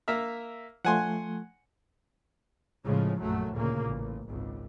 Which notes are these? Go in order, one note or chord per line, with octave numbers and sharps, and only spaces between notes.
A#3 E5 F6
F3 A3 F#5 G#5 C6
A2 C#3 F3 G#3
A#1 F#2 F#3 A3
D2 A#2 C#3 A#3
A1
G#1 C#2